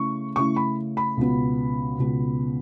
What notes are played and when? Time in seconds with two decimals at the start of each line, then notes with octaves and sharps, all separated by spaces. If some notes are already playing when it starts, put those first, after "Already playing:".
Already playing: C#3 A3 C#4 E4 C#6
0.36 C#3 A3 C#4 E4 C#6
0.56 B5
0.97 B5
1.17 C#2 B2 B3
1.99 C#2 B2 B3